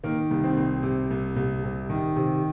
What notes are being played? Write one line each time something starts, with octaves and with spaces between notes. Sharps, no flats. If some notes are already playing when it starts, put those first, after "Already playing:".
D#3 A#3
C2
C4
C2
C3
C2
C2
C3
D#3
C3